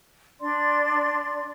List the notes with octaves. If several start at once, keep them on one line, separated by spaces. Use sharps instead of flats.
D4 D5 C6